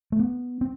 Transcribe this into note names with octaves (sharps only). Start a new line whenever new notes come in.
A3
B3
C4